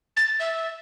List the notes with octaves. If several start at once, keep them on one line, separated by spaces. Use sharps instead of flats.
A6
E5